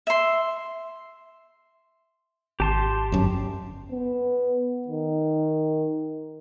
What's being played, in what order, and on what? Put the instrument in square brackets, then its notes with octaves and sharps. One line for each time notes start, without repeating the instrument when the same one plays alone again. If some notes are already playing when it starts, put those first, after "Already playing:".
[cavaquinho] E5 C6
[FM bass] G#1 [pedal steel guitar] G4 A5 C6
[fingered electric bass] G1 F#2
[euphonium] B3
D#3